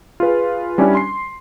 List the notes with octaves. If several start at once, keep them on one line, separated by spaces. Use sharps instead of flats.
F4 G#4 B4
G3 C#4 D4 E4
C6 C7